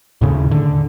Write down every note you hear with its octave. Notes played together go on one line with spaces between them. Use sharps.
D#2 A2 C#3
D3